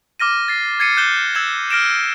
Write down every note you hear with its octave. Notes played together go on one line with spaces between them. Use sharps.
D6 F6 A#6 D#7
A6 C7
G#6 A6 C7 C#7 D#7
F#6 G6 E7 G7
E6 G#6 E7
F6 A#6 D7 E7